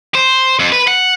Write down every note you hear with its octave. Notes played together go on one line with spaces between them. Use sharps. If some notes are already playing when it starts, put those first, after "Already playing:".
C5
F2
B4
F#5